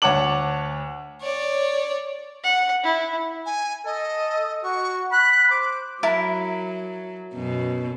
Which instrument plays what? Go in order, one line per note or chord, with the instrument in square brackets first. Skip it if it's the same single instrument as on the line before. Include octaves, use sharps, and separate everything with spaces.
[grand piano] D2 C#5 F#5 A5 D6 F#7
[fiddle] C#5 D5
[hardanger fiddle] F#5
E4
[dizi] G#5
[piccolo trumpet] A4 [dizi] D#5
[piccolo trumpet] F#4 [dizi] C#6
[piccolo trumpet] B5 [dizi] F#6
[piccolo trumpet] C5 [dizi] D6
[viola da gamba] F#3 [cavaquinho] E4 A#4 A5
[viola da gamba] F#2 B2